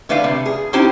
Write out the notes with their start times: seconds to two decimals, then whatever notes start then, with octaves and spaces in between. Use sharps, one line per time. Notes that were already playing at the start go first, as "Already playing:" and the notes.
0.09 D3 A3 B4 D5 F5
0.24 C3
0.46 G#4
0.73 C4 C#4 D#4 E4 G4 C5